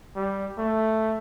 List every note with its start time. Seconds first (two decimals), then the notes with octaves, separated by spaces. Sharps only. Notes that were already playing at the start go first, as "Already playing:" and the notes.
0.16 G3
0.58 A3